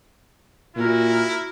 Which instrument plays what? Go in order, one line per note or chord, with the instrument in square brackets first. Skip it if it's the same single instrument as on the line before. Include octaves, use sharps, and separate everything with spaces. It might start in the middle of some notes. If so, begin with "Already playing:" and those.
[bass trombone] A#2 [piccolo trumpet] E4 [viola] F#4 A#4